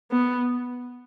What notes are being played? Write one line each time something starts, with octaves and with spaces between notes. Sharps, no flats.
B3